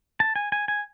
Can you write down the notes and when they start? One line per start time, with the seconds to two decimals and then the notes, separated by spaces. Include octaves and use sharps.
0.20 A5
0.36 G#5
0.52 G#5
0.68 G#5